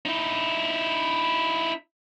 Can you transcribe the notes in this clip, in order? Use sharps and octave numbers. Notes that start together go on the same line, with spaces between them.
D#4 E4